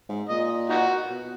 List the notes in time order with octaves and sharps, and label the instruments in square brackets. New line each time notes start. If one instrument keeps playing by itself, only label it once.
[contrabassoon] G#2
[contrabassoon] A#2 [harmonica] D#5
[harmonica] D#4 F#4
[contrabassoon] B2